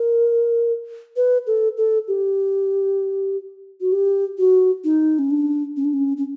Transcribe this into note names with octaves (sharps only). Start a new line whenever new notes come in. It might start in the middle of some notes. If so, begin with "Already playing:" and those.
Already playing: A#4
B4
A4
A4
G4
F#4
G4
F#4
D#4
C#4
D4
C#4
D4
C#4
C#4